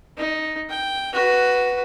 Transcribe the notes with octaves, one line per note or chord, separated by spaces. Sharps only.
D#4
G5
F#4 B4